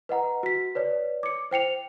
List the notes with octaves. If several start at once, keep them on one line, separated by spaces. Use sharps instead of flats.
B4 D#5 F#5 A#5
F#4 B6
B4 C#5 D5
D6 C#7
C5 G5 C#7 F7